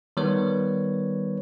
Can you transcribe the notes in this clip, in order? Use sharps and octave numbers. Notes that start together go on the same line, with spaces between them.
D#3 G3 B3 B4 C#5